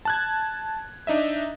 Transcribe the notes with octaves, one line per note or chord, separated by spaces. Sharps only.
A5 F#6 G#6
D4 D#4 D#5 E5